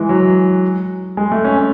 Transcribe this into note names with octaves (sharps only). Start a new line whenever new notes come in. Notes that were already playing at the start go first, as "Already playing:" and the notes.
Already playing: E3 G#3
F#3
G#3
A3
C#4
C#4